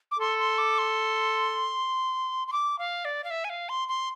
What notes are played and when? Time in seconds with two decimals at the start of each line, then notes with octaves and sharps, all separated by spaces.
0.11 D6
0.19 A4 C6
0.39 C6
0.58 D6
0.78 C6
2.48 C6
2.53 D6
2.79 F5
3.05 D5
3.24 F5
3.31 E5
3.44 G#5
3.50 F5
3.69 C6
3.88 C6